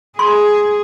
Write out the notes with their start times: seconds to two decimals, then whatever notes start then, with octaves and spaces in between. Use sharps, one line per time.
0.19 G#4 C6